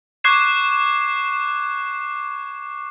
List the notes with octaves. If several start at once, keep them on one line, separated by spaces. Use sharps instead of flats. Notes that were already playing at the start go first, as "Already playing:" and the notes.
C#6 D6 F#6 G#6 C7 E7